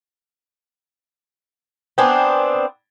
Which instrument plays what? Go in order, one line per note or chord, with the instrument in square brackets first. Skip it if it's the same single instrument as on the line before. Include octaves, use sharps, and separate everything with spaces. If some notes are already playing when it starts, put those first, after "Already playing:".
[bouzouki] B3 C4 D4 [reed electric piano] G5 G#5